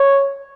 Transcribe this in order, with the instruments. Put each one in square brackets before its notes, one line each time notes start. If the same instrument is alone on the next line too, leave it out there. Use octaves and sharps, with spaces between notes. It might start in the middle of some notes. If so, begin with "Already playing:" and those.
Already playing: [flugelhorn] C#5